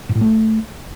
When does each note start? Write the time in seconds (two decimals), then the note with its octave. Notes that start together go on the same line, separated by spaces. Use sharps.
0.09 G#2
0.15 A2
0.21 A3